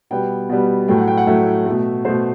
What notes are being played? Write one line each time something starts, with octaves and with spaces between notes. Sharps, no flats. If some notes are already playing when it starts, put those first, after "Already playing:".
B2 G3 B3 G5
B2 G3 B3
A2 F#3 A3 G5
F#5
G5
F#5
A2 F#3 A3 E5
B2 A3
B2 A3 C5